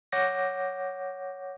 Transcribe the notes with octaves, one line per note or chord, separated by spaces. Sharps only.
C#5 F#5 D6 G6 A#6